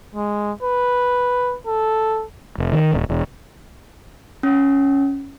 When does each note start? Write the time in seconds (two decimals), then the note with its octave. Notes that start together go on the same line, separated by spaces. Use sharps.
0.15 G#3
0.63 B4
1.67 A4
2.58 F1
2.73 D#3
2.94 D#1
3.09 E1
4.43 C#4